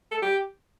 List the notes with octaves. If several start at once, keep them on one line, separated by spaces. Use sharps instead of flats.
A4
G4